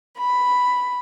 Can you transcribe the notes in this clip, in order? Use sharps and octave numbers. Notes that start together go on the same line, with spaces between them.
B5